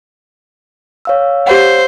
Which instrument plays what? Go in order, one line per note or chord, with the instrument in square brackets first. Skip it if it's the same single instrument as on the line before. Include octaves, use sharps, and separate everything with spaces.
[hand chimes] C#5 F5 E6
[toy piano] G4 F#5 [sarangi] C5